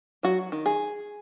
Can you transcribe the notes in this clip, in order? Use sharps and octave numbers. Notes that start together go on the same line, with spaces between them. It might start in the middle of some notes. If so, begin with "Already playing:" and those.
F#3 F#4
D#3
G#4